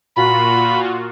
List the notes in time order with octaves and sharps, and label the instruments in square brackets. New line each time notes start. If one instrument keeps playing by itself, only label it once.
[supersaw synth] A#2 F4 F#4 [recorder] B5